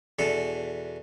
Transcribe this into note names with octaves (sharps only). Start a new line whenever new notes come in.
E2 B2 D4 A4